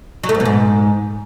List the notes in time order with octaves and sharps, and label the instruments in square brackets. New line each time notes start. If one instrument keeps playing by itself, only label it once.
[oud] F#3
A3
G#2
B2
G#2